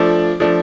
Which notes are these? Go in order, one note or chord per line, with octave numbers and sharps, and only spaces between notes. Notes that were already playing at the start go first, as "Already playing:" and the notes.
Already playing: F3 A3 D4 D5
F3 A3 D4